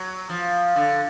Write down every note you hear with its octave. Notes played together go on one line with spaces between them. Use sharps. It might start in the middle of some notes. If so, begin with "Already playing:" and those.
Already playing: F#3
F3
D3